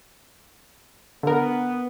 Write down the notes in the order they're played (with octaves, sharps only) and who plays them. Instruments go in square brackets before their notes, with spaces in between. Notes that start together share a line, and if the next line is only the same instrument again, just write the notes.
[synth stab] D3 A#4 [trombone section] B3